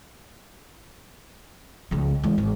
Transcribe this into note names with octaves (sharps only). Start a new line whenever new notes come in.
C#2 F3
E3 G#3
G#1